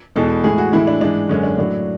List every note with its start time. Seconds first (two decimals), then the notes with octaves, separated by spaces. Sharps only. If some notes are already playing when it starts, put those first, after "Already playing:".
0.16 E2 B2 G#3 A4
0.44 A2 E3 G#3 G#4
0.58 F#4
0.72 A2 E3 G#3 E4
0.87 D4
1.01 G#2 E3 G#3 D4
1.29 F#2 D3 G#3 C#4
1.43 D4
1.58 A2 F#3 D4